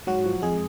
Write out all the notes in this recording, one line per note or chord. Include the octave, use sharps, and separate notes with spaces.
G#2 F#3 F#4
F3
F2 G#3 G#4